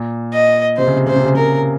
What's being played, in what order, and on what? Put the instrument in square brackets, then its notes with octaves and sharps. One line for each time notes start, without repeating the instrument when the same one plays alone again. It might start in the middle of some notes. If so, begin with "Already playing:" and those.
Already playing: [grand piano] A#2
[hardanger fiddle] D#5
[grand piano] C3 [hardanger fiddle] C5
[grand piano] C#3
C3
[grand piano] C#3 [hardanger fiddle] C5
[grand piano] C3
C#3
[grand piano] C3 [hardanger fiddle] A#4